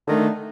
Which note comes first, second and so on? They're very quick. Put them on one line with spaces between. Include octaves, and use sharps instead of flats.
D3 D#3 A3